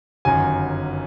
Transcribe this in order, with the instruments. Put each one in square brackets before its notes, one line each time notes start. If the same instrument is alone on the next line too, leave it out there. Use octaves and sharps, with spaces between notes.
[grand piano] G1 F#2 D#3 G#5